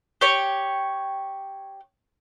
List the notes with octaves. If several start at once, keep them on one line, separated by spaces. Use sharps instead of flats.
G4 C#5